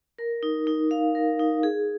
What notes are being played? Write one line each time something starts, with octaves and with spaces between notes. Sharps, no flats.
A#4
D#4
D#4
F5
A#4
D#4
G#4